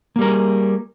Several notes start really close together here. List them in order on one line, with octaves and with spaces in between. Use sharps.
A#3 G3 A#4 G#4